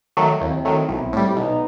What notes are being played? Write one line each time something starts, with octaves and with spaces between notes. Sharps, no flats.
D#3 F#3 A3
D#2 C4 E4
D#3 F#3 A3
B1 C4 E4
A2 G3
B1 B3 D#4